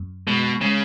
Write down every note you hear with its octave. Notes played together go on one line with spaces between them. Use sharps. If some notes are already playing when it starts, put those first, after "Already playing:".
Already playing: F#2
B2 G#3
C#3 G#3